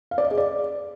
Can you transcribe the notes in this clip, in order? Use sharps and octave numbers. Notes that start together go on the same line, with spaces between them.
F5
D5
D#5
G#4
D5